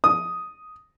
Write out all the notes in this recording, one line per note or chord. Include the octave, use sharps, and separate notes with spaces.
D#6